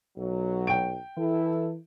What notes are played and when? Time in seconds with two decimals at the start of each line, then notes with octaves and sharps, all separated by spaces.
0.17 B1 F#3
0.67 G5 D7
1.17 E3 E4 A4